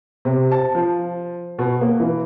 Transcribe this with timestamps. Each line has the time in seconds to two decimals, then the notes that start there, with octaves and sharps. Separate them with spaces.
0.25 C3
0.52 A5
0.75 F3
1.59 B2
1.81 A#3
2.00 E3